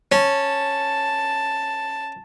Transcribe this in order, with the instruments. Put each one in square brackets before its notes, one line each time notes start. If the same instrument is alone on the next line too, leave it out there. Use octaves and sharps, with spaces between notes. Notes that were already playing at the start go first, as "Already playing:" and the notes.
[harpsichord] C#4 [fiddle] A5